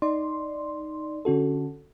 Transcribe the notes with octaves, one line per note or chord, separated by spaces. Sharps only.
D#4 D5 C6
D3 C#4 F#4 A4